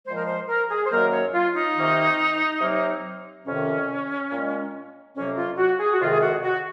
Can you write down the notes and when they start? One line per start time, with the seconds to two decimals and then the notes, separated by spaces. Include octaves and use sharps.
0.06 A#2 F3 G#3 C5
0.17 A#4
0.27 C5
0.48 A#4
0.70 G#4
0.85 C5
0.91 F#2 D#3 F#3 A#3 A#4
1.12 C#5
1.33 F4
1.54 D#4
1.75 C3 D#3 A#3
2.60 C3 F#3 A#3
3.45 F2 C3 D#3 C#4
4.31 A#2 G#3
5.15 F2 C3 F#3 A#3 C#4
5.36 F4
5.58 F#4
5.79 G#4
5.93 F#4
6.00 F2 C3 D#3 G#3 F4
6.12 G#4
6.21 F#4
6.43 F#4